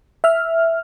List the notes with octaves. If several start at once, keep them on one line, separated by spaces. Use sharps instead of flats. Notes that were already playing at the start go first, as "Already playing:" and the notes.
E5 F6